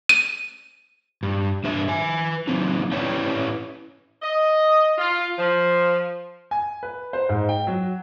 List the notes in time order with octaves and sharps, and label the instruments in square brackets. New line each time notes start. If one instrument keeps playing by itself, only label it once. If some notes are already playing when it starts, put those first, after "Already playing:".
[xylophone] D#7
[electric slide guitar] G2
G2 D4 B4 E5
B4 G#5
F#3 A#3 C4 D#4
C#4 E4 B4 C#5 D5 G5
[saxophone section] D#5
F4
F3
[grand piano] G#5
B4
C5
G#2
G5
F#3